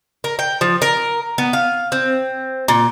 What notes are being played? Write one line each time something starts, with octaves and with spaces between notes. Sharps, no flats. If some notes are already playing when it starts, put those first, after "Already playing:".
A#4
G5
F3
A#4
B3
F5
C4
A#2